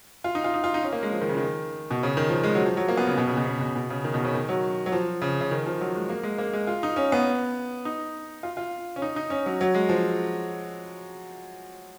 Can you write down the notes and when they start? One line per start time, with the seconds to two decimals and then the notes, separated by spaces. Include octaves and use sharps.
0.24 F4
0.35 D#4
0.44 F4
0.54 D#4
0.64 F4
0.74 D#4
0.83 C#4
0.92 A#3
1.03 G#3
1.12 F3
1.21 D#3
1.29 C#3
1.37 D#3
1.91 B2
2.03 C#3
2.17 D#3
2.29 F3
2.43 G#3
2.55 F#3
2.66 F3
2.77 F#3
2.88 A#3
2.97 B3
3.07 C#3
3.18 B2
3.27 C#3
3.37 B2
3.46 C#3
3.61 B2
3.76 B2
3.90 C#3
4.04 D#3
4.14 B2
4.25 C#3
4.34 D#3
4.49 F#3
4.86 F#3
4.92 F3
5.22 C#3
5.41 C#3
5.51 D#3
5.66 F3
5.81 F#3
5.95 G#3
6.09 A#3
6.23 G#3
6.38 A#3
6.53 G#3
6.67 F4
6.83 D#4
6.96 C#4
7.12 B3
7.85 D#4
8.43 F4
8.57 F4
8.96 C#4
9.02 D#4
9.16 D#4
9.30 C#4
9.46 F#3
9.61 F#3
9.74 G#3
9.89 F3